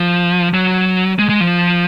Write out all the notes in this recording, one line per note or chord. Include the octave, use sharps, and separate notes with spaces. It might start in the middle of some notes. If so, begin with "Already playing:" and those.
Already playing: F3
F#3
G#3
G#3
F3